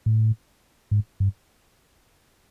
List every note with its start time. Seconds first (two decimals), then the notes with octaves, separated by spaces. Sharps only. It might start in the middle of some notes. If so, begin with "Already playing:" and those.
0.06 A2
0.91 G#2
1.20 G2